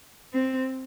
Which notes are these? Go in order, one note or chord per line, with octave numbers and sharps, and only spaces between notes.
C4